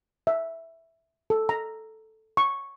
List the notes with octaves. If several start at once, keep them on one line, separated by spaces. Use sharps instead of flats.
E5
A4
A#5
C#6